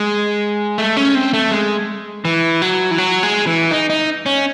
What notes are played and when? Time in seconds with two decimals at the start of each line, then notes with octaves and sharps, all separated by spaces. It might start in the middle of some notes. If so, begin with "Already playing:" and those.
Already playing: G#3
0.78 A3
0.97 C#4
1.15 C4
1.33 A3
1.51 G#3
2.25 E3
2.62 F#3
2.91 E3
2.98 F#3
3.23 G#3
3.47 E3
3.71 D#4
3.90 D#4
4.26 C#4